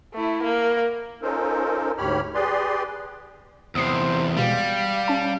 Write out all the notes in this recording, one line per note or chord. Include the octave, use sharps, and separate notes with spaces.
A3 E4
A#3
C#4 D#4 F4 A4 A#4 C5
D2 G#2 G4 C#5 B5 F6
G4 G#4 B4 D5 C6
E2 C3 C5 D#6 C7
B2 G3 G#3 F5
C#4 A5